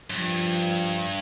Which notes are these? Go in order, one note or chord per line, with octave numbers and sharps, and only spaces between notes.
F#2
G2 F3